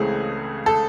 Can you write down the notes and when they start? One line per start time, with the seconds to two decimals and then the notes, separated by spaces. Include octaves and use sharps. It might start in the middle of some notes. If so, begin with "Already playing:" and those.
Already playing: C#2 C#3 E3 A3 C4 G#4
0.66 A4